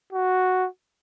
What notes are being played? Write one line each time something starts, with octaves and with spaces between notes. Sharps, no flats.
F#4